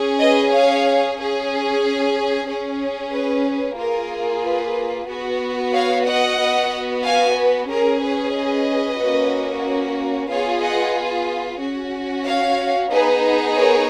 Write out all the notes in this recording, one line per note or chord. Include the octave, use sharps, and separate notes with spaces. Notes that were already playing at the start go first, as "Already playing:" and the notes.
Already playing: C#4 G#4
B4 D#5
C#5 F5
C#4 G#4
C#4 G#4
B4
A#3 F4 G#4 A#4
B4
B3 F#4
C#5 F5
D#5 F#5
B3 F#4
F5 G#5
B4
C#4 G#4 A#4
B4
B4 D#5
A#3 C#4 F#4
B3 F4 G#4 C#5 F5
D#5 F#5
C#4 F#4
C#5 F5
B3 D#4 G#4 B4
A#4 C#5